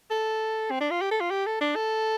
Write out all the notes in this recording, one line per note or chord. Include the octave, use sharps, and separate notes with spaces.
A4
C4
D4
F4
G4
A4
F4
G4
A4
D4
A4